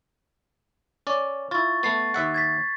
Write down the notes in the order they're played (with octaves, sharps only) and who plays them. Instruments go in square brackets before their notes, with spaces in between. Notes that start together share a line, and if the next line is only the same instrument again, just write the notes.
[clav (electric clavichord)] C#4 D5
[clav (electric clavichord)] E4 F4 [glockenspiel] C#6 A6
[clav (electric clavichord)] A3 B3 [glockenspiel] A6 C7
[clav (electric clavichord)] D#2 E5 F#5
[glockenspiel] G#6 A6 B6